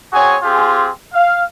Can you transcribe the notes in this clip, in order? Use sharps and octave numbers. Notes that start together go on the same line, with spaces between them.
C4 F#4 G#4 C#5 G#5
C4 F4 G4 G#4
F5